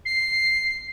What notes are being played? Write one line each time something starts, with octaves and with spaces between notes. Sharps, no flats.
C7